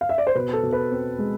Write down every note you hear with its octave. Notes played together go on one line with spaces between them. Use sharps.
F5
E5
D5
C5
B2 B4
A4
B2
B4
C4
G#3